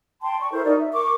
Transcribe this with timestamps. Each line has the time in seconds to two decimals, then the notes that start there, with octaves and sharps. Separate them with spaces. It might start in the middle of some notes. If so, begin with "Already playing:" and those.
0.22 G5 A5 C6
0.40 D5 C#6
0.52 E4 A4 A#4 C5
0.64 D#4 F#4 A#4 D5
0.79 E5
0.92 A#4 C#6 D6